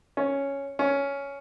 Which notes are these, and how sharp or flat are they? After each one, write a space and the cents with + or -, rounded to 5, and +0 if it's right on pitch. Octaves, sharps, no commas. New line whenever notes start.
C#4 +0
C#4 +10